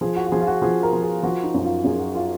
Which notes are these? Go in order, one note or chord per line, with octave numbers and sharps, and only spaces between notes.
F3 G#4
F#4
F#4
F3 G#4
F4
F#4
F3 G#4
A#4
F3
G#4
F3 F#4
D#4
F#2 F#4
F4
F#2 G#4
F#4
F4